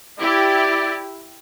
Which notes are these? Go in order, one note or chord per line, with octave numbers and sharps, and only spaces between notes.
E4 G4 D5